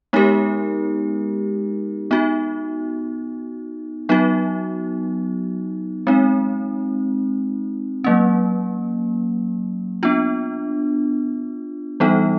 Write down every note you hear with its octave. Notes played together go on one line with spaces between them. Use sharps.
G#3 B3 D#4 G4 A#4
B3 D#4 F#4
F#3 B3 D#4 F#4
G#3 C4 D#4
F#3 A#3 C#4
B3 D4 F4
E3 G3 B3 D#4